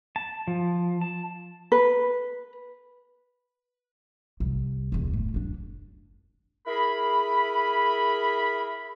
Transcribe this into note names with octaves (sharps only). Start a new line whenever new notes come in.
A5
F3
A5
B4
C2
E1 C#2
A2
F#2 D4
E4 G#4 A#4 B5